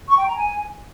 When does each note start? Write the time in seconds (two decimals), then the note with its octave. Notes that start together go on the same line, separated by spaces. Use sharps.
0.09 C#6
0.18 G5
0.27 A#5
0.36 G#5